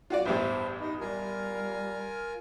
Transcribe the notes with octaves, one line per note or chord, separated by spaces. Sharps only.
F4 F#4 C#5 D5
A1 E2 G2 C5 E5
D#4
G3 F4 A#4 G#5